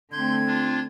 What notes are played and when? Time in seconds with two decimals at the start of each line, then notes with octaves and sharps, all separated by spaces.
0.12 D3 A3 C4 C6 G6 G#6
0.46 D4 F4